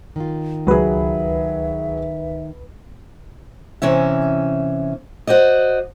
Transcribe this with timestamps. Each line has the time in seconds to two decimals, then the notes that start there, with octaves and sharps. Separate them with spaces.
0.16 D#3 F4
0.67 C#2 F#3 G#4 B4 E5
3.82 C3 E3 C#4 E5
5.27 F#4 C5 D5 D#5